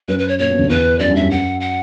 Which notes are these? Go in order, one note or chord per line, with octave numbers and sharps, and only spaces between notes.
F#2 F#3 B4
B4
C#5
A#2 C#5
B2
D2 D3
E2 E3 B4
F#2 F#3 D5
G2 G3
F#2 F#3 E5
F#5
F#5